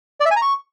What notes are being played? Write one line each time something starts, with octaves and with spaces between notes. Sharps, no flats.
D5
E5
G#5
A#5
C#6